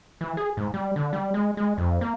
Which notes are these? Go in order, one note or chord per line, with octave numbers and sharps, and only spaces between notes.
E3
G#4
G#2
G3
D3
G3
G#3
G#3
F2
A#3